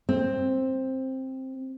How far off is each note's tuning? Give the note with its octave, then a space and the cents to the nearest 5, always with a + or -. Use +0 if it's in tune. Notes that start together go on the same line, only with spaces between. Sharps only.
C4 +10